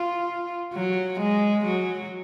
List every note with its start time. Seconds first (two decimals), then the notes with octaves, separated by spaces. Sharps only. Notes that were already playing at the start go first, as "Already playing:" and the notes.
Already playing: F4
0.74 F#3
1.20 G#3
1.65 F#3